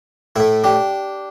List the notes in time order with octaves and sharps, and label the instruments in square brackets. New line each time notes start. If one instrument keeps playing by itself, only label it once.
[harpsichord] A2 A3 E4
D4 G4